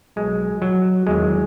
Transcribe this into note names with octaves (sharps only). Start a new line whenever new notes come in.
B1 B2 F#3 G#3
F#3
E2 D#3 F#3 G#3